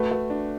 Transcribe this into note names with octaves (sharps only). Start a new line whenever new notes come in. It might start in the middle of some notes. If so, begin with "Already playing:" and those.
Already playing: A3 F#4 B4
A3
D4